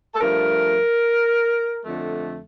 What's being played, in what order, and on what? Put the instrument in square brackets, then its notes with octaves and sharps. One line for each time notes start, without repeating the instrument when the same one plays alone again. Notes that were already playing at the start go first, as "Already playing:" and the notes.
[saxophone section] A4
G2 F3 A3 A#4
F2 D3 A3